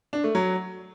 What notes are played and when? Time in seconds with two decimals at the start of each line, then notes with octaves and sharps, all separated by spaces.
0.13 D4
0.24 A3
0.35 F#3